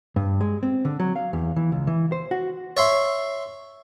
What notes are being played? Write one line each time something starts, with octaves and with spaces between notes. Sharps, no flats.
G2
G#3
C4
D3
F#3
F5
E2
E3
C#2
E3
C5
F#4
C#5 E5 C6